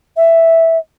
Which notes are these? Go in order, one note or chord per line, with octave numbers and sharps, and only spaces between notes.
E5